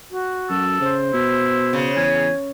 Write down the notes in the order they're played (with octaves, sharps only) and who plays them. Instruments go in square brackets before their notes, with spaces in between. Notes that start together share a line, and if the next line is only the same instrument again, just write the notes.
[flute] F#4
[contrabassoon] F#2 [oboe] A4
[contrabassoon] C#3 [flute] C5
[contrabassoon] B2 [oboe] E4
[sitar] C#3
[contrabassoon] E2 [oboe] G#5